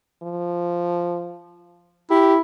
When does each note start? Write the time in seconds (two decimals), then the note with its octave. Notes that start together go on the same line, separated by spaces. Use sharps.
0.23 F3
2.10 E4 G4